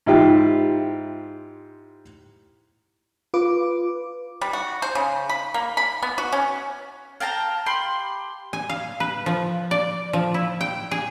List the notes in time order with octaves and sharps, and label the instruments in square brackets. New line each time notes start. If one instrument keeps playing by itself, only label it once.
[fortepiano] G#2 E4 F4 G4
[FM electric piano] F4 B4 D6
[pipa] G3
F#4
C5
C#3
B5
A#3
B5
B3
F#4
C#4
[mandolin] F5 G5 A5 A#5
G4 B5 C6
[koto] G#5
F5
B4
F3
D5
F3
E4
G5
G#4